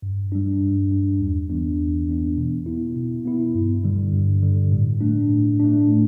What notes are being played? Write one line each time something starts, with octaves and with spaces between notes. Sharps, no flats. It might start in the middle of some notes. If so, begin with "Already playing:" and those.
G2
G3 D4
G2
G3 D4
E2
E3 B3 D4
E2
E3 B3 D4
B2
B3 E4
B2
B3 E4
G2
D3 G3
G2
D3 G3
A2
A3 D4
A2
A3 D4
A2